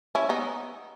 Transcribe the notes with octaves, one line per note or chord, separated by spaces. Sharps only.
C#4 E4
B3 D#4